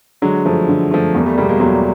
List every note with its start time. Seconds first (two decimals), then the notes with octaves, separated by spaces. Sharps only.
0.22 D3 F#3 G#3
0.45 F3 A3
0.68 D3
0.91 F3 A3
1.14 E2 G3 A3
1.20 A#3
1.26 G3 A3
1.38 B2 G3 G#3 A#3
1.49 G#3 A#3
1.60 E2 F#3 G#3